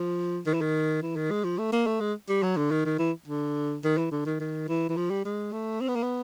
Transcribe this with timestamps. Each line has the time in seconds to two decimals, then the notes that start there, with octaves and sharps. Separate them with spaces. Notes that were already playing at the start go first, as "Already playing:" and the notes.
Already playing: F3
0.46 D#3
0.54 E3
0.61 D#3
1.02 E3
1.16 D#3
1.31 G#3
1.44 F3
1.58 A3
1.72 A#3
1.87 A3
2.00 G#3
2.29 G3
2.43 F#3
2.57 D3
2.71 D#3
2.85 D#3
2.99 E3
3.27 D3
3.84 D#3
3.98 E3
4.12 D3
4.26 D#3
4.39 D#3
4.68 E3
4.89 E3
4.97 F3
5.10 G3
5.25 G#3
5.52 A3
5.81 C4
5.88 B3
5.95 A#3
6.03 B3